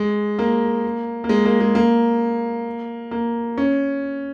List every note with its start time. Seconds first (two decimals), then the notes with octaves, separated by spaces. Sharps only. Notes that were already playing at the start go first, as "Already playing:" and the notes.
Already playing: G#3
0.39 A#3
1.24 A#3
1.29 G#3
1.45 A#3
1.60 G#3
1.75 A#3
3.11 A#3
3.58 C#4